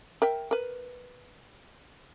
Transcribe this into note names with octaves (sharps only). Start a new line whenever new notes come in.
A#4 E5 G5
A#4 B4